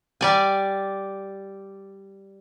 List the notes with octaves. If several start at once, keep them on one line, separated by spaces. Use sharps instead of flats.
G3 D5 G#5